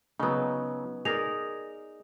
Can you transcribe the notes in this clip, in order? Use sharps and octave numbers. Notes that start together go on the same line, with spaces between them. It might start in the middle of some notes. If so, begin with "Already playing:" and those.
C#3 F#3 B3 D#4
D#4 G#4 A#4 D5 D#6 A#6 F7